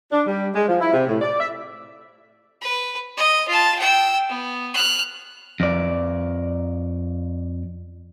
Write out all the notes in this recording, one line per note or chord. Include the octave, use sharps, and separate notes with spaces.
D4
G3
G#3
F3
E4
C3
A2
D5
E5
B4
D#5
F4 A5
G5 E6
B3
F6 F#6
F2 D5